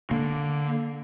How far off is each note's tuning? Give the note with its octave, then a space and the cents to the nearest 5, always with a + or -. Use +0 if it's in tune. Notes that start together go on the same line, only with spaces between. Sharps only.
D3 -5 A#3 +0